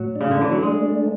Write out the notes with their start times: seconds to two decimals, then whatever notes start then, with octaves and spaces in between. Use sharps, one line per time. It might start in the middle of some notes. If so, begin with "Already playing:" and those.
Already playing: A2 F#3
0.16 D4
0.21 C#3
0.31 D3
0.39 E3 A3
0.51 F#3
0.62 G#3 D4
0.86 A3